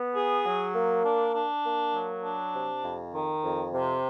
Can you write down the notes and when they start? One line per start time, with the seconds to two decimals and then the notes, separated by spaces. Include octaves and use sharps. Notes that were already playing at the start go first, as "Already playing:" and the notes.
Already playing: B3
0.15 G#4
0.45 F#3
0.74 A#3
1.04 D4
1.34 D4
1.65 A#3
1.94 F#3
2.24 D4
2.54 C3
2.83 F2
3.14 D#3
3.44 F2
3.74 C3